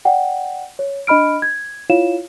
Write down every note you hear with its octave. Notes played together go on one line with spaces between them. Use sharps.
D5 F#5 G5
C#5
D4 D#5 B5 F6 D7
G#6
E4 F4 C#5 F5 E7